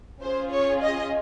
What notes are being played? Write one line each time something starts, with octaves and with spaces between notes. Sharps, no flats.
C#4 F4 G#4 C5
C#5
D#5